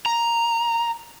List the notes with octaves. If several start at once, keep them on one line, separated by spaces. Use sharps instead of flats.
A#5